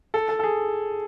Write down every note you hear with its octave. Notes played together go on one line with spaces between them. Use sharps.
A4
A4
A4
G#4